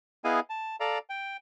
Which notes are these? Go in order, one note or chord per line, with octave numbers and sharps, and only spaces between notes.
B3 E4 G#4 D#5 F5 G#5
A5
A4 D5 F5 A#5
G5